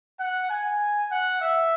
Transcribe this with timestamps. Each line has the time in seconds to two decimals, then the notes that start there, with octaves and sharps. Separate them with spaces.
0.20 F#5
0.50 G#5
1.11 F#5
1.41 E5